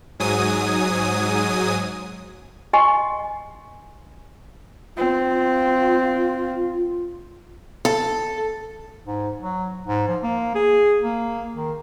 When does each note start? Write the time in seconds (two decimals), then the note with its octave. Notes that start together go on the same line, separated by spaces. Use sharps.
0.20 G#2 F#3 G#5 D#6
2.73 F#4 D#5 G#5 C#6
4.97 C4 F4
7.85 A4
9.07 G#2
9.41 F#3
9.88 G#2
10.08 F3
10.23 A#3
10.55 G#4
11.02 A#3
11.54 D#3